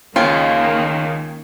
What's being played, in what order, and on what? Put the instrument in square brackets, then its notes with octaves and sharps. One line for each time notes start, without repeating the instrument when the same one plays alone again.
[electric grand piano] C#2 C#4 G5 [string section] D#3 A#3 [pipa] F4